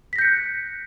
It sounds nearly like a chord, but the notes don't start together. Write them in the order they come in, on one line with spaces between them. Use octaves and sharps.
B6 A#6 G6 C#7 F#6